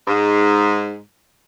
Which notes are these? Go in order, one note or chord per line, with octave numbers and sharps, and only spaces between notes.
G#2